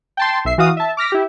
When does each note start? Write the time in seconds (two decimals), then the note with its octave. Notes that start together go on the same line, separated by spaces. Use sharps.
0.17 G5 A5 C6
0.45 B1 E5 C7
0.58 E3 F#4 F5 D#6
0.77 E5 A5
0.97 D6 F6 A#6 B6
1.12 E4 G4